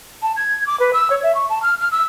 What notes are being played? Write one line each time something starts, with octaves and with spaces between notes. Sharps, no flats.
A5
G#6
D6
B4
E6
C#5
E5
C#6
A5
F6
F6
E6